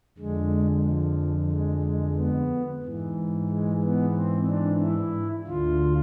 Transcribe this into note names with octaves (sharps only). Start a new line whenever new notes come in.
F2 D3 G#3
F3
G#3
G#3
B3
G#2 E3
G#3
B3
C4
D4
E4
D2 D3 F4